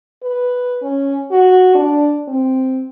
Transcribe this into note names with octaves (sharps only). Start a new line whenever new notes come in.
B4
C#4
F#4
D4
C4